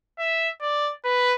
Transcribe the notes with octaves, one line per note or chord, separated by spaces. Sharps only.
E5
D5
B4